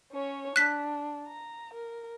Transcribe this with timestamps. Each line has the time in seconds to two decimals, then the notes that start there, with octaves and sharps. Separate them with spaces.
0.12 C#4 C#5
0.56 D4 F#6 B6
1.27 A#5
1.74 A#4